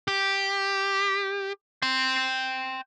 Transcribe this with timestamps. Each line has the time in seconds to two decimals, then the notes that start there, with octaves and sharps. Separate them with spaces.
0.08 G4
1.82 G5 C6